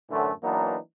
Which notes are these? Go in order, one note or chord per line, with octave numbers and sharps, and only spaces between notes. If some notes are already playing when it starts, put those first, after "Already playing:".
F#2 A2 D3 E3 F#3 A3
E3 F#3 A#3 B3 D4 D#4